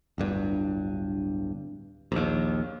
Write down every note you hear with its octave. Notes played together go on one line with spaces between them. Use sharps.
D1 G1 G2
A#1 D#2